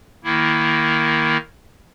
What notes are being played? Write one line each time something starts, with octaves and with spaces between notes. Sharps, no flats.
D#3 A#3 E4